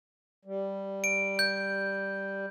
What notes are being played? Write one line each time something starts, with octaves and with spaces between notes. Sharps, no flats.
G3
D7
G6